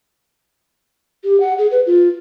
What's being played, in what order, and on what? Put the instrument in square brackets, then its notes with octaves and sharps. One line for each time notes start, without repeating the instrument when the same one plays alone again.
[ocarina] G4
F#5
G#4
B4
F4